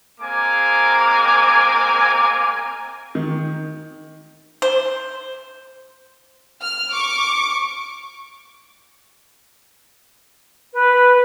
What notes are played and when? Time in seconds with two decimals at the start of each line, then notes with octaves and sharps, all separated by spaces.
0.21 G#3 A#3 C4 G#5 A#5 D6
3.15 D#3
4.62 C5
6.62 F6
6.94 C#6 D6
10.72 B4